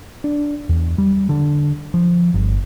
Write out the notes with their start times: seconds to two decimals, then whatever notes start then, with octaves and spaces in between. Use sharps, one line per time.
0.24 D4
0.69 E2
0.98 G3
1.29 D3
1.94 F3
2.34 G1